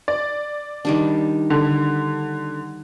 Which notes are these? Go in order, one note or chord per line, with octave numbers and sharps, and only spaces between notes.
D5
D#3 G3 D4
D3